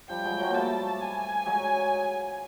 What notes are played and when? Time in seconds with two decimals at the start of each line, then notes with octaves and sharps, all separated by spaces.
0.09 F3 G3 G5
0.25 F#3 G#3
0.40 F#3 G#3
0.49 A#3
0.55 G3 A3 A5
1.01 G#5
1.46 F#3 G#3